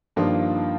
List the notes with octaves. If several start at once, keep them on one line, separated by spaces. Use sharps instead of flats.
G2 D#3 F3 A#3 D4 F4